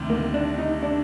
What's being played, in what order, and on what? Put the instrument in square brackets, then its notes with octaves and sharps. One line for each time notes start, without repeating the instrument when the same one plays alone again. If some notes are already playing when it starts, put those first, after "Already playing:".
Already playing: [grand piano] D2 C3 D#3 G3
[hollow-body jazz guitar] A#3
D4
D#4
D4